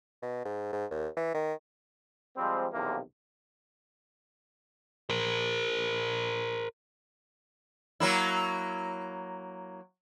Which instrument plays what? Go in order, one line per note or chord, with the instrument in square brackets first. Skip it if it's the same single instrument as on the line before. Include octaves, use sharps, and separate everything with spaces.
[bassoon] B2
G#2
G#2
D#2
E3
D#3
[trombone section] F3 G3 G#3 C4
B1 E2 C3 E3 F3 A#3
[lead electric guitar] A#4 C5
[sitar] F#3 A#3 E4